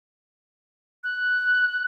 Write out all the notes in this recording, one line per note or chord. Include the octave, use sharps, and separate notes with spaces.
F#6